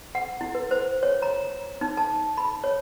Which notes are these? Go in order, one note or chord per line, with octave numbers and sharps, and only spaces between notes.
F#5
E4
B4
C5
C#5
A#5
D#4
A5
B5
C#5